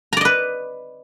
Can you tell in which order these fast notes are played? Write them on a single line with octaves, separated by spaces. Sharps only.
A#5 D5 D#5 B4